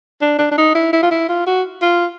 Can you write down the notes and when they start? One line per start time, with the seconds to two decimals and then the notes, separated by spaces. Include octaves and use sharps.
0.21 D4
0.39 D4
0.51 D4
0.58 D#4
0.75 E4
0.93 E4
1.03 F4
1.11 E4
1.29 F4
1.46 F#4
1.82 F4